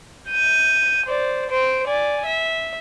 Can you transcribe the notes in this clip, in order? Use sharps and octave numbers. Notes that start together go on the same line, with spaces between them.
G6 D#7
C5 D5
C5 D7
D5 G#5
E5